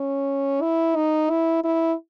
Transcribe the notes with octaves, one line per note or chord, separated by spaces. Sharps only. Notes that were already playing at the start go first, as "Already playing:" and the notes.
Already playing: C#4
E4
D#4
E4
E4